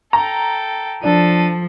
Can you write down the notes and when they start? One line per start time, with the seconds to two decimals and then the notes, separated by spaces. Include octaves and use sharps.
0.13 A4 G5 A#5
1.03 F3 D4 A4 D#7